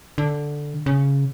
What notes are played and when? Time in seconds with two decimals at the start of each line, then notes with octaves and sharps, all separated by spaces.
0.18 D3
0.86 C#3